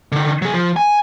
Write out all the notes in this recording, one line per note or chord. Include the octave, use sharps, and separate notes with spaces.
D3 D#3
F#3 G#4
F3
G#5